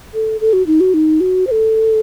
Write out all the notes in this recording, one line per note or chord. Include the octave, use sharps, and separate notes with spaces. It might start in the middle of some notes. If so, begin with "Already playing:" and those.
A4
A4
F#4
D#4
F#4
D#4
F#4
C5
A4